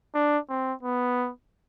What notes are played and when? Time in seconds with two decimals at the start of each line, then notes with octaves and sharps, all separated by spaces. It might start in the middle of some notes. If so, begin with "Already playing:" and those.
0.14 D4
0.49 C4
0.83 B3